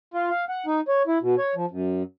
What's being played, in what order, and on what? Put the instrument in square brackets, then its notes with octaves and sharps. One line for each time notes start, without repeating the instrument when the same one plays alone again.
[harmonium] F4
F5
F#5
D#4
C#5
E4
B2
C#5
F3
F#2